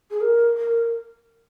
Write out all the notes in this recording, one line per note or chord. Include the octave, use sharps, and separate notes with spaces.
G#4
A#4
A#4